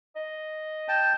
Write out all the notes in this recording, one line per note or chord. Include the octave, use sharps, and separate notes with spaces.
D#5
G5 A5